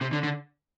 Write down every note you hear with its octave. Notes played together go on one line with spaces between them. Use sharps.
C3
D3
D3